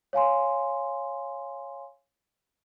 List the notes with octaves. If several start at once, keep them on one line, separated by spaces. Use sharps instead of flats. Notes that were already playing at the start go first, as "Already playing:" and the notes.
C#5 F5 G#5 C6